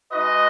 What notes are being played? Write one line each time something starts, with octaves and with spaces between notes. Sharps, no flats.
G#3 D#4 F#4 B4 D#5